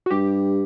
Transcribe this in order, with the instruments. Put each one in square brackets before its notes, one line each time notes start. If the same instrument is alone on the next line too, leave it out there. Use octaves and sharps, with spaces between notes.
[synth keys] F#4
[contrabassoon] G2 [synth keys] G4